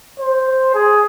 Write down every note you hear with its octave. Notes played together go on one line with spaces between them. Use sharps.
C5
G#4